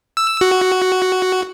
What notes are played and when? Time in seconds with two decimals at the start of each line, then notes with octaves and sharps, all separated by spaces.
0.17 E6
0.41 F#4